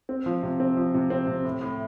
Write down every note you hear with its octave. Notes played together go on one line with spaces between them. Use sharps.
C4
F3
C3
C4
F3
C3
C4
C3
A2
A2